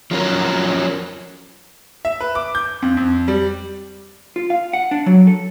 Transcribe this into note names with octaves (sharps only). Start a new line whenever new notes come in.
F3 F#3 C#4 A#4
E5
B4
D6
G6
F2
F2
G3
F4
F5
F#5
D4
F#3
A4